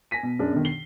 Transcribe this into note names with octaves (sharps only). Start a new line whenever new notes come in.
G#5 A#6 B6 D#7
B2
F#2 D4 G#4
B2 D3 D#3
C7 G7